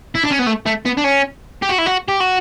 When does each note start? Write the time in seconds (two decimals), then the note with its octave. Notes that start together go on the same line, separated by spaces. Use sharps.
0.15 E4
0.24 D4
0.31 C#4
0.39 B3
0.47 A3
0.66 A3
0.85 B3
0.97 D4
1.04 C#4
1.62 G4
1.69 F#4
1.79 E4
1.86 F#4
2.08 G4
2.20 F#4